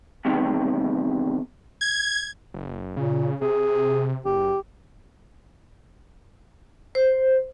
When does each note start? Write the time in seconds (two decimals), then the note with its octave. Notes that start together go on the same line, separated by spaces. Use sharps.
0.25 E2 G2 C3 D#3
1.81 G#6
2.54 F#1
2.97 A#2 C#3
3.41 C3 G#4
4.25 F#1 G4
6.95 C5